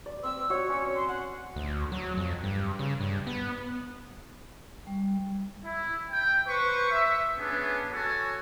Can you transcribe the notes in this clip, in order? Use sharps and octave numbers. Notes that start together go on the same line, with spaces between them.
D5
C4 E6
F#4 C#5
C#4
C6
F#5
D2
F#3
F2
G2
C#3
G2
B3
G3
E4
G5
B4 C5 C#6
E5
B3 C#4 D4 G#4
F#4 A4 C#5 G#5